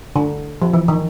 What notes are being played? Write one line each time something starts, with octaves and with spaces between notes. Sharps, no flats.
D3
F3
E3
D#3